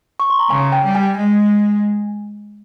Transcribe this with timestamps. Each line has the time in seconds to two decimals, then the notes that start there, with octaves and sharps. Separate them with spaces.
0.20 C#6
0.30 C6
0.39 A#5
0.49 C#3 G#5
0.72 G5
0.84 G3
0.95 G#5
1.17 G#3